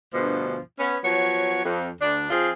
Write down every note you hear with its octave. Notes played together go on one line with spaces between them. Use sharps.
D2 G2 B2 F3
B3 C#4
F3 F#3 B3 C#5
F2
D2 D4
F3 C4 F4 G#4